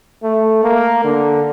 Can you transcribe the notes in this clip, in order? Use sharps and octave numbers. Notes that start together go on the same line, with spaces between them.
A3
A#3
D3